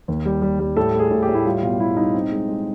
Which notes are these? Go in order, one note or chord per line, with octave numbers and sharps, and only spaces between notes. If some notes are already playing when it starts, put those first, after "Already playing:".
D#2
G3
G3
G3
A2 A4
A3
G#4
A2
G4
A2
E4
G3 F4
B2 F4
G3 E4
G3 D#4
C4
G#3
G#3